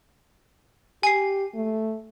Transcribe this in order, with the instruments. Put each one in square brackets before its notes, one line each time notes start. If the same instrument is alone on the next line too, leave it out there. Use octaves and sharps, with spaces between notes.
[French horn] G4 [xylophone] G#5 C7
[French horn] A3